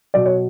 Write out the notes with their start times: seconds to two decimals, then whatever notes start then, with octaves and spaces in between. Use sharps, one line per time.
0.14 B2 F#3 D5
0.26 C#5